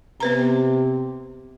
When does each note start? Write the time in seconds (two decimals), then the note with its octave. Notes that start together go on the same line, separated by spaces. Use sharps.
0.20 C3 B3 B4 A#5